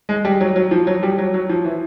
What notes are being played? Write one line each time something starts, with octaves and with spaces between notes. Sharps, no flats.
G#3
G3
F#3
F#3
F3
F#3
G3
F#3
F#3
F3
E3